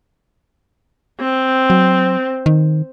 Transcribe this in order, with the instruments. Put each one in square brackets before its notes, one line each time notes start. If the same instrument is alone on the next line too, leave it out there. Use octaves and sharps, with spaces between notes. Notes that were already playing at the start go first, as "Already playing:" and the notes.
[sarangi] C4
[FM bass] F#3
D#3